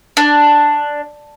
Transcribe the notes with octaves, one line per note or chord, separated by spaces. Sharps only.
D4